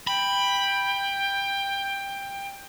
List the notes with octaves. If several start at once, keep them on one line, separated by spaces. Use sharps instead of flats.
G5 B5